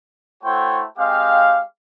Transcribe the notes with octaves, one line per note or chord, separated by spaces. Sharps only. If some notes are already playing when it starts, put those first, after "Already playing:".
A3 E4 F#4 C5 C#5 G5
G#3 C4 G4 F5